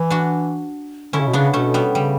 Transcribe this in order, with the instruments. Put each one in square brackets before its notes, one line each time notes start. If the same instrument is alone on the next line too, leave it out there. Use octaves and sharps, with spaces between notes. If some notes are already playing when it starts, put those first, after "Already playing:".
Already playing: [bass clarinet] E3
[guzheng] D4 F#4
[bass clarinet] D3 [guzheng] C#4 E4
[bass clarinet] C#3
B2
[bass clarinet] C#3 [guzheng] B3 D4
[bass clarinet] B2 [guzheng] A3 C#4
[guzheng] G3 B3
[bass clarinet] C#3 [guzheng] G3